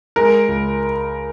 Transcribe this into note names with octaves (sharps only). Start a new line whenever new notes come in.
G#3 A#4
C#2